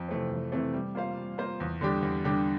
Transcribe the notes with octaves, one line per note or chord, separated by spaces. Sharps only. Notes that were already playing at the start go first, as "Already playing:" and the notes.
Already playing: F2
C3 E3 A3 C4
F2
C3 E3 A3 C4
G3
A#3 F4 C5 F5
G3
A#3 F4 C5 F5
E2
D3 G3 D4 G4
E2
D3 G3 D4 G4